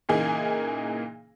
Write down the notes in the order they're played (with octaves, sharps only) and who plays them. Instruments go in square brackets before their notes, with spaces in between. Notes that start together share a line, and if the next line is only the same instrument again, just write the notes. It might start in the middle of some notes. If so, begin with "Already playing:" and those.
[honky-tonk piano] A#2 C#3 E3 A#3 D#4 G#4